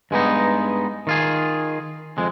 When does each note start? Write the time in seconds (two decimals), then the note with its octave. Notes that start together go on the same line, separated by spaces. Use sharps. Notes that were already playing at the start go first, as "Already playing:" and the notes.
0.11 G2 G#3 B3 D#4
1.07 D#3 F4 G#4
2.18 F2 G#3